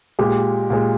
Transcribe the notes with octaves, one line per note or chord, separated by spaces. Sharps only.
A#2 G#3 G4
A#2 G#3